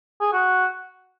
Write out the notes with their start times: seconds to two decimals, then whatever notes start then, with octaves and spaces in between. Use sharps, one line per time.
0.21 G#4
0.33 F#4